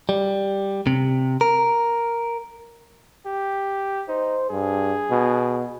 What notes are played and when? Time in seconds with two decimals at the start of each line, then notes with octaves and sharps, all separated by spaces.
0.09 G3
0.87 C3
1.41 A#4
3.26 G4
4.08 D#4 C5
4.50 G2 G#4
5.11 B2